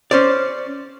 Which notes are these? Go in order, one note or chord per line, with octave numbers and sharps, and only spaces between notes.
C#4 C5 D5